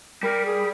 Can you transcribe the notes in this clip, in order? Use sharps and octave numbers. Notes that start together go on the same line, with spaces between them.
G3 A#4
G#4